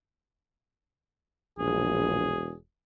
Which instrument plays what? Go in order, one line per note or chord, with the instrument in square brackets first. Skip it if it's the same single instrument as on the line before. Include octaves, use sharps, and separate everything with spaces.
[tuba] E1 [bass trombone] A#1 [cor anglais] G#4